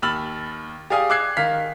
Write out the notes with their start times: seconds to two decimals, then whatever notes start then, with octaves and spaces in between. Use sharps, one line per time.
0.02 D#2 B5 E6 F6 A6 F#7
0.90 G4 G#4 D5 F5 G#5 D#6
1.10 D6 E6 F#6 G#6 C7
1.37 D#3 F5 B6